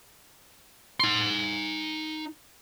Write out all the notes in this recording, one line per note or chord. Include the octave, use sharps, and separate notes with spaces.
D#4 C6